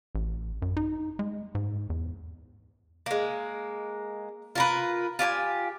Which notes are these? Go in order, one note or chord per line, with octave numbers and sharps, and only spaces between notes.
A1
F#2
D#4
G#3
G#2
E2
G#3 A#3
F4 A#4 B4
F4 G4 C5 G#5